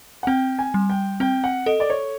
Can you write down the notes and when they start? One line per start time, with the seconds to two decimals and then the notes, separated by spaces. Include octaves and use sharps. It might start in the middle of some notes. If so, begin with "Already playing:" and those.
0.23 F#5
0.27 C4 G5
0.59 G#5
0.74 G3
0.90 G5
1.20 C4 G5
1.44 F#5
1.66 A4 D#5
1.80 D5
1.90 C#5